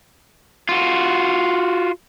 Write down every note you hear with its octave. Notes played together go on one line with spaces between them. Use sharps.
F4 F#4